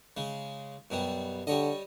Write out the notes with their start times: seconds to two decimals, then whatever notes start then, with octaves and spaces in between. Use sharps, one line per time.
0.17 C#3 G#3
0.90 F#2 B2 G3
1.47 D3 G3 C#5 D#5